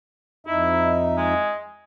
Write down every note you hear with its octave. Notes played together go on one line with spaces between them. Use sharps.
F2 D#4 E4 E5
G#3